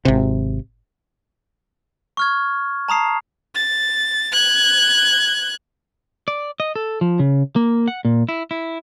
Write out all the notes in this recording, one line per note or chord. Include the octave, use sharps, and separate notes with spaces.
G#1 C3
C#6 F6 G#6
A5 A#5 D#6 C7
A6
F#6 G#6
D5
D#5
A4
F3
C#3
A#3
F#5
A#2
E4
E4